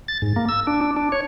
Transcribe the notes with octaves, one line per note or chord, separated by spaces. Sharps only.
A6
G#2
A#3
E6
D4
D4
D4
C#5